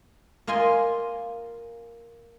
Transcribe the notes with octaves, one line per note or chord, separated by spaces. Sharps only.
A#3 F4 D#5 G#5 C6